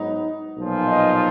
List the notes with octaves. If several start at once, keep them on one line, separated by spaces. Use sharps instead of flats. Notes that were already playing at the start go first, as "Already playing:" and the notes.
Already playing: G#2 F#3 B3 D#4
B1 A#2 F3
D#5